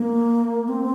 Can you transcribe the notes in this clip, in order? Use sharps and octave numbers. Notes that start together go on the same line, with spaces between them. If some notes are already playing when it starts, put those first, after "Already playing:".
Already playing: A#3
C4